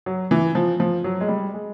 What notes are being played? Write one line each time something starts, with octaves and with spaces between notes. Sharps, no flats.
F#3
E3
F3
F3
F#3
G#3
G3
G#3